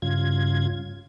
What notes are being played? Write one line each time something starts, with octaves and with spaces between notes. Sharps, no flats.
G2 C#3 F4 G#6